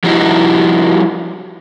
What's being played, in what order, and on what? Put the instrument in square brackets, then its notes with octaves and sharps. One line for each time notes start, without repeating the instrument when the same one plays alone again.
[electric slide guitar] F3 G3 D#4 E4 F#4